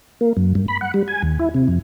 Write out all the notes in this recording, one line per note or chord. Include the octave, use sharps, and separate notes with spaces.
A#3
F#2
G2
B5
F#5
G3
G#5
D#2
E4
C3
F2